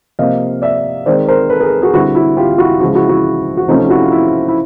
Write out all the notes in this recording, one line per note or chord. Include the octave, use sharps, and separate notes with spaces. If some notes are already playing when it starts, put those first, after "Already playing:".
C3 F3 A#3 D#5 F5
D5 E5
D#3 G#3 C4 C5 D5
A#4 C5
A4 B4
G#4 A#4
F#4 G#4
D3 G3 C4 E4 F#4
E4 F#4
F4 G4
E4 F#4
C#3 F3 G#3 E4 F#4
E4 F#4
E4 F#4
F#4
C3 F3 A3 C#4 D#4 F4
G4
E4 F#4
F4
E4
E4